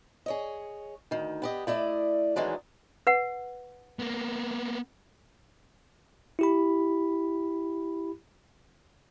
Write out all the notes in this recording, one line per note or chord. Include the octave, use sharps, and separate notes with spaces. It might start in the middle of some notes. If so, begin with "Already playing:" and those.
G#4 C#5 D#5
D2 D#3
B3 G4 D#5
A3 E4 D5 D#5
D#3 E3 F#3 G#3 D4
B4 F#5
A#3 B3
E4 G4 B5